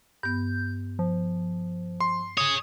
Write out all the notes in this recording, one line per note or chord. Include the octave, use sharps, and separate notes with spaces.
G2 B3 G6
F3
C6
G#4 C#5 D#6